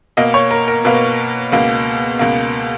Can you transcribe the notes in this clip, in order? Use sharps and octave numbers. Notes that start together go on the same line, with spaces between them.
B2 A#3 D#5
C#5
A#4
A#4
B2 A#3 B4
C#2 B2 A#3
C#2 B2 A#3